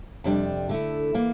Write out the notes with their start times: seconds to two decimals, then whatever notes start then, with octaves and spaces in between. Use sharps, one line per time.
0.24 F2 C3 G3 D4
0.69 D3 A3 E4
1.14 E3 A#3